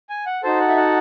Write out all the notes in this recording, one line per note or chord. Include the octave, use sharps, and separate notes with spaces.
G#5
F#5
D#4 F#4 A4 C5
F#5
E5
F#5